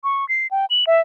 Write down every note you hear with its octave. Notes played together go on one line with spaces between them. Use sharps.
C#6
C7
G5
F#7
E5